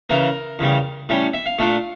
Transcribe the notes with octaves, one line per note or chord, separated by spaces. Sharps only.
C#3 E3 A#3 A#4
E2 C#3 G3
A2 G3 C#4
E5
F5
A#2 A3 D4 F4